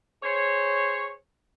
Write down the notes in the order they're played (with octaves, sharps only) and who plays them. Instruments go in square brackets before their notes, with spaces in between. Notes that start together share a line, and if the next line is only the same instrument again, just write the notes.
[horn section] G#4 C5 C#5